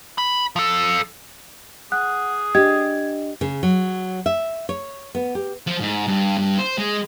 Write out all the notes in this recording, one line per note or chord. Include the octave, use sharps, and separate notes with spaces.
B5
F3 A4
G#4 F#5 F#6
D4 G4 D#5 G#6
C#3
F#3
E5
C#5
B3
G4
F3
G#2
G2
G2
C5
G#3